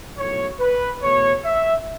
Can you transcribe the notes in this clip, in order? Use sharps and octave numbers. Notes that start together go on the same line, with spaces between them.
B1 A2 F#3 A3 C#5
B4
E2 B2 A3 C#5
E5